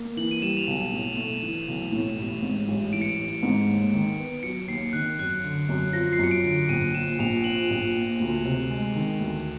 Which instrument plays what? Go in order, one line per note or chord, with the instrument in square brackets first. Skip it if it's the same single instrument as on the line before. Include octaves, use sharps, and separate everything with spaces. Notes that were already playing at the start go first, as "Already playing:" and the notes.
Already playing: [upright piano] A#3
[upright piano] E3 [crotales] F#7
[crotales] D#7
[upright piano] G3 [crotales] E7
[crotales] F7
[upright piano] B1 [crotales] E7
[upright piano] A2
A3
E3
B1
A2
A1
G#2
A1
[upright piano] E3 [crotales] D7
[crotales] C#7
D7
[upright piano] A1
G#2
D#2
D#3
B3
[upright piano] F#3 [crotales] C#7
[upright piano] D#2 [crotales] C7
[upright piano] D#3 [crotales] F#6
[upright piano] F#2 [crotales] F#6
[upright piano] D3
F#2
[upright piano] F3 [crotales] A#6
[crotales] C7
[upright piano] F#2 [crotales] C#7
[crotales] D7
[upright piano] D3
[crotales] D7
[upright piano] A#1 [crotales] D#7
[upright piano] A#2 [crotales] E7
[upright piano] A#1 [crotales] F7
[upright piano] F3 [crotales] F#7
[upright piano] A#1
A#2
D2
C3
G#3
D#3
D2